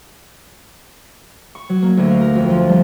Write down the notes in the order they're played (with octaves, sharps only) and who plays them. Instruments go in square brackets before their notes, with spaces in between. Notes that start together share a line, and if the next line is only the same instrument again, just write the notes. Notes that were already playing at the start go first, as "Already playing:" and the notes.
[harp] C#6
F#3
A#3
D2
F5
A#4
F2
F3
G3